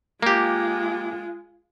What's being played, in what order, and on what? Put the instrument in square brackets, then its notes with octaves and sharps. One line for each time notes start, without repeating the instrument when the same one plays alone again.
[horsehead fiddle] G#3 F4 [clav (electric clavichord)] A#3 G4